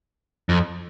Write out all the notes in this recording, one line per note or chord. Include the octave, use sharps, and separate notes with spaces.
F2